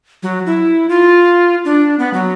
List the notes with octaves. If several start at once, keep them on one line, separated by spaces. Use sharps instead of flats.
F#3
E4
F4
D4
B3
F#3